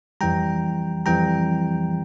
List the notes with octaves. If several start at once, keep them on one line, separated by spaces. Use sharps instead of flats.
F2 E3 G3 G5 A#5
F2 E3 G3 G5 A#5